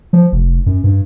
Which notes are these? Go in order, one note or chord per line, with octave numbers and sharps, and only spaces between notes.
F3
F1
F#2
G2